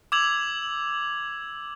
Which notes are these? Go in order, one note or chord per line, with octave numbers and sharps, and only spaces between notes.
D6 E6 G#6 F7 F#7